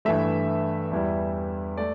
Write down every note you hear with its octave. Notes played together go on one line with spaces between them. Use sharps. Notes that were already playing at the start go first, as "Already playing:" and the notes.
G2 E3 A3 E5
E2 E3 G3
A3 D5